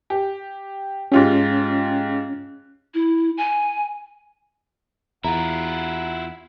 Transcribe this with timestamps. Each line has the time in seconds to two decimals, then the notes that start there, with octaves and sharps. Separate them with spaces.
0.10 G4
1.12 G#2 C#4 F4 G4
2.94 E4
3.37 G#5
5.24 E2 E4 F4 F#5 A#5